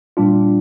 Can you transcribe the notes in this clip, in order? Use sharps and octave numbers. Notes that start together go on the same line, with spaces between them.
A#2 G3 D4 F4